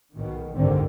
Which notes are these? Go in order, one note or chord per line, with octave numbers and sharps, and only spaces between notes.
B1 B2 D#3
F#1 C2 G#2 D3 D#3 C4